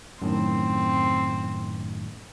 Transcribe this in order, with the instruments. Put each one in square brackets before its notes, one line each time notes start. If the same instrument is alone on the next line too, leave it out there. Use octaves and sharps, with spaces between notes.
[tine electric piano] F#2 A2 D#3 [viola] C4